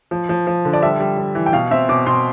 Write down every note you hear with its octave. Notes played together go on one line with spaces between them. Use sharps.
F3
F3
F3
D3
D5
G3 E5
G3
G3
E3
G5
B2 F5
C4 E5
B2 D6
B2 C6